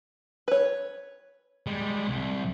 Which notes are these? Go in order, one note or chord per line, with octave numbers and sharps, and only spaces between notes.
B4 C#5
G3 G#3
C2